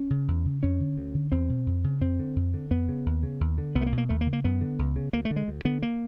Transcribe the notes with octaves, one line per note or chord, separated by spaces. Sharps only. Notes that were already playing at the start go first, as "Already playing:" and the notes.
Already playing: C#4
C#3
E2
C#3
F2 C#4
D3
D2
D3
E2 C4
B2
F2
C#3
F2 C4
D3
F2
D3
F2 B3
C#3
D#2
C#3
D#2
D3
C2 B3
A3
A#3
B2
A#3
D#2 A3
A#3
C#3
A#3
F#2 B3
D3
C#2
C#3
D2 A#3
A3
D3
G#3
D2
D3 B3
A#3